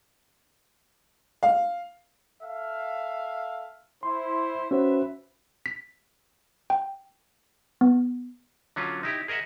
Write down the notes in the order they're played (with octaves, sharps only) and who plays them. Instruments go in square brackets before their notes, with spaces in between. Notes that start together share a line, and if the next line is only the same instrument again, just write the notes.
[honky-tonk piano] F5
[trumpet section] A4 E5 F5
[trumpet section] E4 C5 [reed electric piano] C6
[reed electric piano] C#4 F#4 C5 [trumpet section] B4 E5
[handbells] B6
G5
B3
[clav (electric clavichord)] D3 F#3 C#4 F4
D#4 E4 G4
G#4 A#4 D#5 E5 F#5